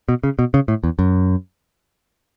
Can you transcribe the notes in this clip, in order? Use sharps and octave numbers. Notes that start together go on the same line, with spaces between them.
B2
C#3
B2
C#3
A2
E2
F#2